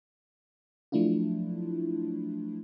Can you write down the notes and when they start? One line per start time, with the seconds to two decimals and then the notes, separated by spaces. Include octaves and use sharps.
0.92 F3 F#3 A3 D4 E4 F4